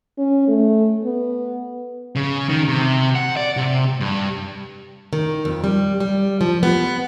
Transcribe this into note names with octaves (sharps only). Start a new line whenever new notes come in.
C#4
A3
B3
C#3
D#3
C3
F#5
D5
C3
G2
D#3
F2
G3
G3
F3
B3